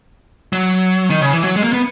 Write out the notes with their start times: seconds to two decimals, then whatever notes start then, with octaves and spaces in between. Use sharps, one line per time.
0.53 F#3
1.10 D#3
1.21 C#3
1.33 E3
1.44 F#3
1.56 G#3
1.64 A#3
1.73 B3